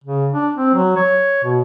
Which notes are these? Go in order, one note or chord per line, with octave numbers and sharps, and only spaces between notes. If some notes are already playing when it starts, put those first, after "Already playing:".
C#3
D4
C4
F#3
C#5
B2